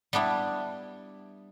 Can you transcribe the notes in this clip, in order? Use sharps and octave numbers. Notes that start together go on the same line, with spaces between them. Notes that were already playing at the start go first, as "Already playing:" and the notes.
G3 B3 D4 E4